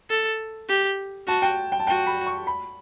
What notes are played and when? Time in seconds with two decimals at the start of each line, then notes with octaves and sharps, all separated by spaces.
0.10 A4
0.69 G4
1.27 F#4 A5
1.42 G5
1.72 G5
1.80 A5
1.87 F#4 G5
2.07 B5
2.27 C#6
2.47 B5